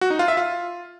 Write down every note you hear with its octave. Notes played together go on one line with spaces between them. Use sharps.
F#4
D#4
F4
E5
F4